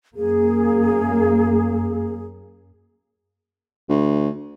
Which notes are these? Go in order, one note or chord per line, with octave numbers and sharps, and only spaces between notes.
F#2 A#3 G#4
D2